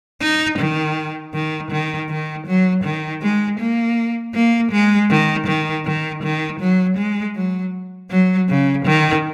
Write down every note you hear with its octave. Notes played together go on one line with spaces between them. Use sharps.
D#4
D#3
D#3
D#3
D#3
F#3
D#3
G#3
A#3
A#3
G#3
D#3
D#3
D#3
D#3
F#3
G#3
F#3
F#3
C#3
D#3